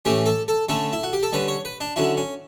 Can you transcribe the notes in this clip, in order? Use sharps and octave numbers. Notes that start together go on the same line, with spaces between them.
A2 E3 A3 C#4 G4
A4
A4
D3 A3 C#4 A4
E4
F#4
G4
A4
D3 G3 C#4 B4
C#5
B4
D4
D3 F#3 C#4 E4
C#4